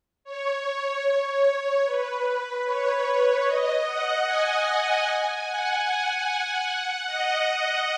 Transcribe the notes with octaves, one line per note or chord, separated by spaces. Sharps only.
C#5
C#5
C#5
B4
C#5
D#5
F#5
G#5
G#5
F#5
G#5
F#5
D#5
F#5